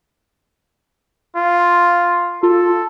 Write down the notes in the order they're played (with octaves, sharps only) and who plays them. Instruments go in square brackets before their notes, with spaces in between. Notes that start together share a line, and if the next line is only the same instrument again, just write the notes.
[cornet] F4
[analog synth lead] F4 [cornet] A4